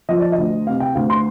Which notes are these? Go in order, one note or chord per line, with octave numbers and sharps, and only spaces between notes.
F3 D#5
D5
D#5
D2
C3 F5
G5
D2 F5
C6